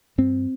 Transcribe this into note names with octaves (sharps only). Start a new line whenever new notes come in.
G2 C4